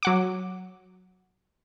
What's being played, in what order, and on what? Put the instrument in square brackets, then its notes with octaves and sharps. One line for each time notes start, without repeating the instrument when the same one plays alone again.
[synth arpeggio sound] F#3 F#5 D6